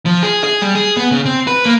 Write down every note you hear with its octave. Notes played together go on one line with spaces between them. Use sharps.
F3
G#4
G#4
G3
G#4
B3
C#3
C4
B4
A#3